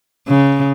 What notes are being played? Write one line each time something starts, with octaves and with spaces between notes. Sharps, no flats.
C#3